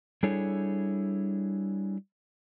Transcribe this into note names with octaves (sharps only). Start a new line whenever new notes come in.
G3 D4 E4 G#4 A4 C#5